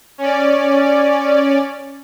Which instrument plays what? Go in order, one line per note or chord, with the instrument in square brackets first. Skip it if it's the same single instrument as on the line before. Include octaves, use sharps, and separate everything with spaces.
[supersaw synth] C#4 D5